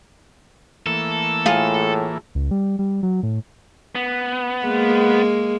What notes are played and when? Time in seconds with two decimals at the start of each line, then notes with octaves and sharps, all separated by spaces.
0.86 E3 A3 A#3 A4
1.46 A2 F4 G#4
2.35 C#2
2.51 G3
2.79 G3
3.03 F#3
3.23 A2
3.95 B3
4.65 G#3 A#3